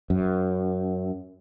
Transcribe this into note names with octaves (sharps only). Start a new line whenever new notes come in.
F#2